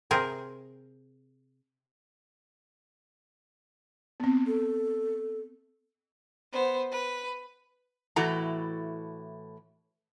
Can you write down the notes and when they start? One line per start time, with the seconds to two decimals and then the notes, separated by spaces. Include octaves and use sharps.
0.11 C3 C4 G#4 A#4
4.20 B3 C4
4.47 A4
6.53 B3 C5
6.92 B4
8.16 A2 E3 E4 F#4 A4 A#5